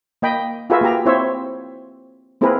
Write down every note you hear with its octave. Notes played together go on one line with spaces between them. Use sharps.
A#3 D#5 G5 B5
F4 F#4 G#4 A#4 B4 E5
A#3 G4 A#5
C4 E4 C5 C#5 E5
A#3 C4 E4 G#4 A#4 B4